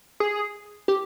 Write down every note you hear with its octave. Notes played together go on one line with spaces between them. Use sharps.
G#4
G4